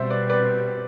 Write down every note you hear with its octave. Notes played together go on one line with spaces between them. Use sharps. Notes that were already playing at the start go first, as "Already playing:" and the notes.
Already playing: B2 G3 C4 C5 E5
B4 D5
B4 D5